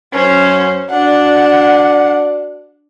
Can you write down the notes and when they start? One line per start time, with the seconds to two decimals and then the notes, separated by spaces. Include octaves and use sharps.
0.14 F#2 C#4 C5
0.90 D4 F#4 D5 F#5